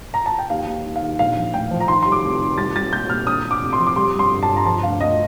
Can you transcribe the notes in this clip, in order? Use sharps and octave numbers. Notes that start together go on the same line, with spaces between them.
A#5
A5
G5
D#2 F5
D#2
D#3
F5
D#2
A#1 F5
F3
A2 G5
F3
A#5
D#3 C6
G3 C6
D6
F1
D#3
C2 A6
C2 A6
A#2 G6
A#2 F6
D3 D#6
D3
D6
F1
C6
F3
D6
G3 C6
G2
C6
G1
A5
G1
A#5
F3 A5
D2 F5
D2 D#5